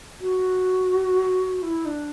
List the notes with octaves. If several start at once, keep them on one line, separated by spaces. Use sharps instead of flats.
F#4
E4
D4